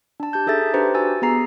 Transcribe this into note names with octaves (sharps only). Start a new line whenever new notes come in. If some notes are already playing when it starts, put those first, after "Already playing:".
D4 A5
G4 A5 G6
D#4 G#4 A4 E5 A6
D4 G4 B4 C5 A#5
F#4 G#5 E6 A6
B3 G#4 A#5 C7